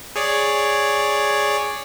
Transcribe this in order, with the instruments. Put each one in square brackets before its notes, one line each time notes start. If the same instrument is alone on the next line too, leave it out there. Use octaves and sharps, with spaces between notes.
[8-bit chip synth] G#4 C#5 D5